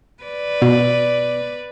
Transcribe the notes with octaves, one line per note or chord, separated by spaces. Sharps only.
B4 D5
B2